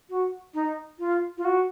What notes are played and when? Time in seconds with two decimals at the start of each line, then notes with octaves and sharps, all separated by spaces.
0.10 F#4
0.54 D#4
0.99 F4
1.38 F4
1.45 F#4